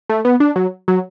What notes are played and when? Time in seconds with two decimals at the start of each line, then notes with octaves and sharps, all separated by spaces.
0.09 A3
0.25 B3
0.40 D4
0.56 F#3
0.88 F#3